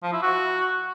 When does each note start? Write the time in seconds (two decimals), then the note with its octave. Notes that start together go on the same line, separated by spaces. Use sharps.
0.03 F3
0.13 E4
0.22 F#4